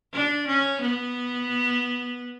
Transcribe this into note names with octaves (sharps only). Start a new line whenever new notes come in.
D4
C#4
B3